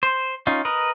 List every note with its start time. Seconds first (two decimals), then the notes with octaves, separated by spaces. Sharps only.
0.03 C5
0.47 C#4 D#4 F4
0.65 A#4 B4 D#5